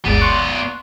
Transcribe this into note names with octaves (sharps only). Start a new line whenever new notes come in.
G1 D2 G#3 B3 D5
C6 C#6 F#6